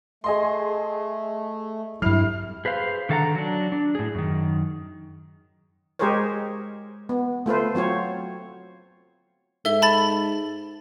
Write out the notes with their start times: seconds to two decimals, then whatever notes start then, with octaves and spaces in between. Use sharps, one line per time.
0.24 A3 G#4 D#5 C6
2.02 G2 C3 F#3 E4 F6 C7 F7
2.65 G#4 B4 C5 F5
3.09 D3 D#3 A4 F5 F#5 A#5
3.35 F#3 D4
3.72 D4
3.95 A2 G#4
4.15 F#2 D#3
5.99 G#3 G4 G#4 A#4 C5 C#5
7.09 B3
7.46 A3 F4 B4 C5
7.75 F#3 C4 F4 C#5
9.65 G#2 A4 E5 G7
9.82 A5 B5 A6